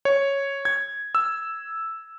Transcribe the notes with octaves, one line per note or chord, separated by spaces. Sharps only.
C#5
G#6
E6